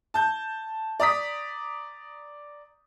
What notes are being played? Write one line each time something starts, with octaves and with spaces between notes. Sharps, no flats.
A5 G6
D5 A#5 D#6 B6